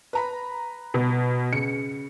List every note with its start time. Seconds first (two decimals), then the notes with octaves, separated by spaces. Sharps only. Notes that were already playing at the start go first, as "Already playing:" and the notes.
0.13 B4 A#5 B5
0.94 B2
1.53 C#3 C#7